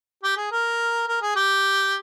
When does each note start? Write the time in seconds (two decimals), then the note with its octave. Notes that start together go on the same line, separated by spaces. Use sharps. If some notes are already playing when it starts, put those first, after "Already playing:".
0.23 G4
0.37 G#4
0.52 A#4
1.08 A#4
1.22 G#4
1.36 G4